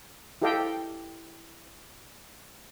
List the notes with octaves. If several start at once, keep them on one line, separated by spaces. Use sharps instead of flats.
E4 G4 A4 D#5 F5 G5